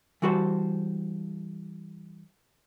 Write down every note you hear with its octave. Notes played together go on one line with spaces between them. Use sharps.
E3 G3 F#4 A4 B4 C5